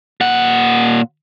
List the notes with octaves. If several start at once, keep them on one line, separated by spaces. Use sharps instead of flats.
A#2 F#5